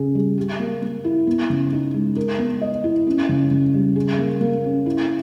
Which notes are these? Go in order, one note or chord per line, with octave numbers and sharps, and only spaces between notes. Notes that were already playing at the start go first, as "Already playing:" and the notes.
Already playing: C#3 C#4 G#4
G3
G4
A#3
A#3
E4
B3
C#3
D#4
G#3
A#4
B3
D#5
E4
C#4
C#3
C#3
G3
G#4
A#3
A#3
C#4
E4